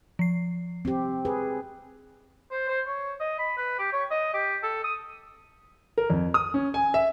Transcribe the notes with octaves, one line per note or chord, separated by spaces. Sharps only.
F3 C7
C4 G4
G#4 B4
C5
C5
C#5
D#5
B5
B4
G4
C#5
D#5
G4
A4
D#6
A#4
F2
D#6
C#4
G#5
E5